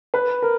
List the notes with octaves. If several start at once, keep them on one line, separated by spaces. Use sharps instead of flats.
B4
A#4